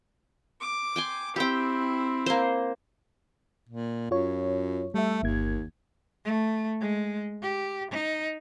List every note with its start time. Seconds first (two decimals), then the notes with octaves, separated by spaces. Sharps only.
0.61 D6
0.96 G5 G#5 C6
1.36 C4 E4 G4 G5
2.26 A#3 C5
3.69 A#2
4.11 F#2 F4 C#5
4.94 G3 A3 E5
5.23 G1 D#2 A#3 G#6
6.25 A3
6.81 G#3
7.42 G4
7.91 D#4